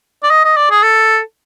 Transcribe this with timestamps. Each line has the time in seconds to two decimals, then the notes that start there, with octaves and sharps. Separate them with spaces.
0.23 D5
0.30 D#5
0.44 D#5
0.56 D5
0.71 G#4
0.83 A4